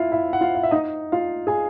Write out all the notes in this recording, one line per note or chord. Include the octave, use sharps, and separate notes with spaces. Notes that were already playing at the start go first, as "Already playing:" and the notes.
Already playing: E4 F4 E5 F5
E4 E5
F#5
F4 F5
F5
E5
D#4 D#5
F4 F5
G#4 G#5